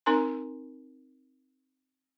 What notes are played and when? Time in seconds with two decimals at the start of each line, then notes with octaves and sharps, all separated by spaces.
0.06 C4 D#4 A#4 G#5 A#5 C6